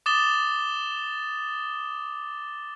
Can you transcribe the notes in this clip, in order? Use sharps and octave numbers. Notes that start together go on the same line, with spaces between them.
D6 D#6 A6 E7 G7